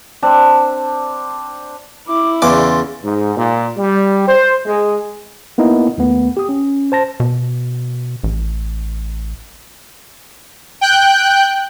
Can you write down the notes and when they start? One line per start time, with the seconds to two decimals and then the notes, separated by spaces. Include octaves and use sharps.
0.22 C4 D4 D5
2.08 E4 D6
2.42 E2 C#3 D5 C6 D6
3.04 G#2
3.36 A#2
3.77 G3
4.27 C5
4.66 G#3
5.58 A#3 B3 D#4 E4 D#5
5.98 D#2 A3 B3
6.37 G4 D#6
6.49 C#4
6.92 C5 A5 A#6
7.20 B2
8.23 A1
10.81 G5 F#6 G6